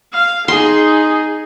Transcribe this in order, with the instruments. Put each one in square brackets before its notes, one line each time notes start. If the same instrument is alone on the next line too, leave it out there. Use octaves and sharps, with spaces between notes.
[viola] F5
[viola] D#4 [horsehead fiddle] G#4 [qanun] C6